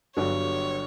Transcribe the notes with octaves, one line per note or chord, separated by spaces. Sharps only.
G1 G2 D3 F#3 C#5